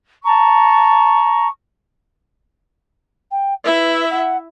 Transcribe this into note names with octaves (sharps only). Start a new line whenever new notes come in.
A5 A#5 C#6
G5
E4 B4 E5
F#5